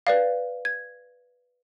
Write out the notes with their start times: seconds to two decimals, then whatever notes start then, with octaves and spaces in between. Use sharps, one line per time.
0.07 B4 D5 F5
0.65 G#6